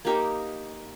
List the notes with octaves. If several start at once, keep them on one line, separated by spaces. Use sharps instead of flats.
A#3 D#4 G4 A#4